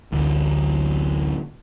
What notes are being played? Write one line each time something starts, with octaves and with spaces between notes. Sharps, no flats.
A1 D2